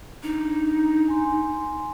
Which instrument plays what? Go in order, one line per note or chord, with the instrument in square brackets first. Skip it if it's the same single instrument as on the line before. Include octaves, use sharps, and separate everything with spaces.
[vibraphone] D4 [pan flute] D#4
[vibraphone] G#5 C6